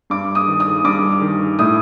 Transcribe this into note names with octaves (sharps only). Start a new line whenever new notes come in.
G2 D6
D#6
D#3
D#6
G2 D6
D#3
A2 D#6